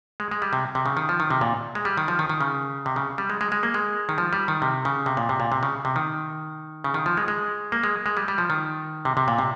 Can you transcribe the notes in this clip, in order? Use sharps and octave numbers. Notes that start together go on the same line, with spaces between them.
G#3
G#3
G3
C3
C3
C#3
D#3
F3
D#3
C3
A#2
G#3
G3
D#3
F3
D#3
D#3
C#3
C3
C#3
G3
G#3
G#3
G#3
A#3
G#3
D#3
F3
G3
D#3
C3
C#3
C3
A#2
C3
A#2
C3
C#3
C3
D#3
C#3
D#3
F3
G#3
G#3
A#3
G#3
G#3
G3
G3
F3
D#3
C3
C3
A#2
C3